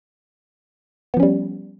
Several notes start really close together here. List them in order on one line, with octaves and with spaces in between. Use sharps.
B3 F3 C#4 G3